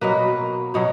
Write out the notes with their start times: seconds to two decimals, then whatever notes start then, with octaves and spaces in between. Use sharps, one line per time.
0.01 B2 F#3 A#3 B4
0.74 B2 F#3 C#5